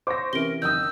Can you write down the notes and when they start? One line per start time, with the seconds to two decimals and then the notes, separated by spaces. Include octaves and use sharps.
0.07 C5 C#5 C#6 D6 A#6
0.33 C3 E3 C#4 E4 A#4 D7 G7
0.62 F#1 D#3 D#6 E6 G6